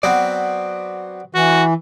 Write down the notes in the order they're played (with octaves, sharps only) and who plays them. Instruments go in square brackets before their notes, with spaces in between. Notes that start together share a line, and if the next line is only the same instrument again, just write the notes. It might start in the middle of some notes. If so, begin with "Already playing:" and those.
[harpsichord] F#3 B3 C4 [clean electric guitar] D5 F#5
[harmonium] E3 [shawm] F#4